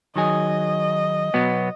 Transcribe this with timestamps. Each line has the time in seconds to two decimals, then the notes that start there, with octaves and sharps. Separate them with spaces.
0.16 D#3 F#3 G#4 D#5
1.34 B2 F#3 B3